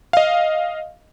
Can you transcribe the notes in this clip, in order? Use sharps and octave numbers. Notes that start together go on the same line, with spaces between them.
D#5 F5